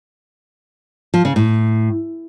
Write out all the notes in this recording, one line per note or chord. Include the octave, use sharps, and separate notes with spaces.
F3
C#3
A2